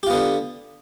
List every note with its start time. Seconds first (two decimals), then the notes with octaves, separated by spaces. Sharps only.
0.03 G4
0.07 F4
0.10 B3
0.13 D3